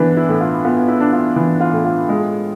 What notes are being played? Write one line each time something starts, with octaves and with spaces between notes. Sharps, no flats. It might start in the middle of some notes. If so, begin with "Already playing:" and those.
Already playing: E3 B3 D4 B4
E4
A2
F4
B3 F4
E4
D4
F4
E3
F4
A2
F4
G#3